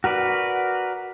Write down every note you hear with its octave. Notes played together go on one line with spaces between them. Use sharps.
F#4 A#4 B4 D5